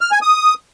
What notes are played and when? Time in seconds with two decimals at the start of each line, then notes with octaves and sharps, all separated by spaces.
0.01 F6
0.12 G#5
0.22 D#6